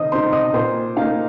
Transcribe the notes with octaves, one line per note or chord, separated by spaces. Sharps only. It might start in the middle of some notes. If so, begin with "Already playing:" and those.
Already playing: D#3 C4 C5 D#5 D#6
C4 D#4 C5 C6
D#5 D#6
A#2 C5 C6
A#3 D#4 F5